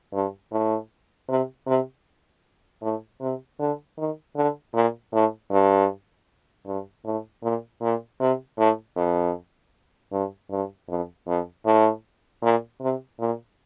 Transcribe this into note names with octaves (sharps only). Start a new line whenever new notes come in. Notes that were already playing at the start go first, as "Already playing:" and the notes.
G2
A2
C3
C3
A2
C3
D3
D#3
D3
A#2
A2
G2
G2
A2
A#2
A#2
C3
A2
F2
G2
G2
F2
F2
A2
A#2
C3
A#2